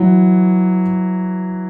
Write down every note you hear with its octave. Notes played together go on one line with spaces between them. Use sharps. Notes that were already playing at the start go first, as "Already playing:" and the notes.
Already playing: E3 F#3